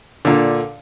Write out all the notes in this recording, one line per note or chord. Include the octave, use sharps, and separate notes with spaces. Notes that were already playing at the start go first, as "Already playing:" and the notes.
A#2 D3